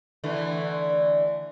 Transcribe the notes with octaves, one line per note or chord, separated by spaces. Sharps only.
D3 E3 A3